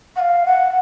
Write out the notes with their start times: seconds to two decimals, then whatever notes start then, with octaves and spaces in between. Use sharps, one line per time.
0.16 F#5
0.19 F5
0.45 F#5